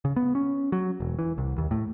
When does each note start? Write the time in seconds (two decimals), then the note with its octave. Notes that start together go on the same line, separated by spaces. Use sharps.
0.05 C#3
0.16 B3
0.35 C#4
0.72 F#3
1.00 E1
1.19 E3
1.38 C2
1.58 D#2
1.71 A2